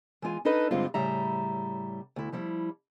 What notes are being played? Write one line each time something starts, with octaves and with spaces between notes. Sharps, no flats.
E3 G#3 F4 G#5
D4 D#4 A4 B4 D#5
G2 D3 G3 G#3 C4 F4
A2 C#3 G3 E5 A#5
D2 E4
F3 G3 E4